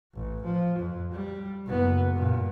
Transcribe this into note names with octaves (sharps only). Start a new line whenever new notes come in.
A1
F3
F2
G3
F#1 B3
G2 A#2